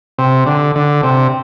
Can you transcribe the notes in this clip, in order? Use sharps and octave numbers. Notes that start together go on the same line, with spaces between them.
C3
D3
D3
C3